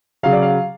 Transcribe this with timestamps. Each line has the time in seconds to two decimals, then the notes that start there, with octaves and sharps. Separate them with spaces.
0.23 C#3 F#3 F5
0.33 D5
0.42 F5